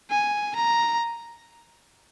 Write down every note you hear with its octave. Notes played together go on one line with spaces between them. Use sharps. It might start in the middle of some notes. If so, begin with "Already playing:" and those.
G#5
A#5